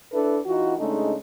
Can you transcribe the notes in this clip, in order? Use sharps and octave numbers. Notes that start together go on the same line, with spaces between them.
D4 E4 A4 B4
E3 D#4 F4 F#4
C#3 G#3 A3 D4 D#4